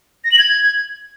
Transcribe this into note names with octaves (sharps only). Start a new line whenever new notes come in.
A#6
F#7
G#6